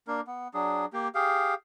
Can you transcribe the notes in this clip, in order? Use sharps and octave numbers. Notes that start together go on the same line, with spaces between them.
A#3 D4 A#4
B3
F#3 D4 G#4
A#3 G4
G4 G#4 F5